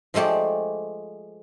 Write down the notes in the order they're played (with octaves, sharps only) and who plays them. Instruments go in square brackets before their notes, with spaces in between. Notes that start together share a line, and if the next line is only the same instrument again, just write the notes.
[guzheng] F3 G#3 A3 G4 D5